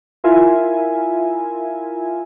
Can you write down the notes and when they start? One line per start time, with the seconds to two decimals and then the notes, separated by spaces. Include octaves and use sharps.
0.24 E4 F4 A#4 E5 G#5